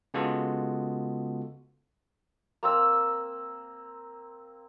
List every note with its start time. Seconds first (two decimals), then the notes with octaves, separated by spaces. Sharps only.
0.14 C#3 G#3 B3 F4 F#4 A4
2.63 A#3 C4 E6